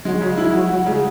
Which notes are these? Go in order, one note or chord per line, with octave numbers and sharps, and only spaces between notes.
F#3 G#3
C#3 F#3
F#3 E4
F#3 F#4
F#3 F#4
C#3 G#3